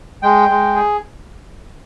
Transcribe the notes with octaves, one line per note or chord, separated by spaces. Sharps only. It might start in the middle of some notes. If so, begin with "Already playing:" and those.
G#3 G5
G#3
G#4